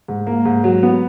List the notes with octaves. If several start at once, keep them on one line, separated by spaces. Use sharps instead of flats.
G#2
A#3
G#2
F#3
B3